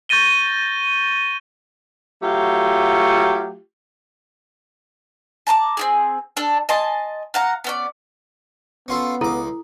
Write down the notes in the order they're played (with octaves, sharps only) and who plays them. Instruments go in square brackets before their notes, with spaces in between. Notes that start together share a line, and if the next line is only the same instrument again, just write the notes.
[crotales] C#6 G6 A6 A#6 D#7 G7
[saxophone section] F#3 A3 F4 G4
[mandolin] A5 A#5 C6 D6
C4 E4 G#4
D4 A4
D#5 G#5 A5 C6
F5 F#5 A#5
B3 C#4 D5
[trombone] B3 [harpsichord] C#4 F4 A4
[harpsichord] C#2 D6 [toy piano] E4 A4